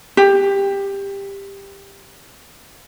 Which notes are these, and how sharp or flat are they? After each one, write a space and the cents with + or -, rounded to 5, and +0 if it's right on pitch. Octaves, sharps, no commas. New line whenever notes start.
G4 +15